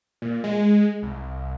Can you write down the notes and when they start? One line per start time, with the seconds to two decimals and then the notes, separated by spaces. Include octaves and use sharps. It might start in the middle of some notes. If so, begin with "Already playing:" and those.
0.22 A#2
0.44 G#3
1.03 C2